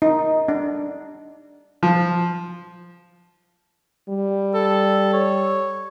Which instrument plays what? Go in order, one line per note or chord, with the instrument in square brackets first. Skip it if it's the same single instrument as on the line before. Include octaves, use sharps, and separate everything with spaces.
[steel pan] D#4
D4
[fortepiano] F3
[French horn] G3
[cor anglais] A4
C#5